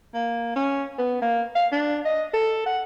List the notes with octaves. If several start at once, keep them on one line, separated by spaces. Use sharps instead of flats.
A#3
C#4
B3
A#3
F5
D4
D#5
A4
F#5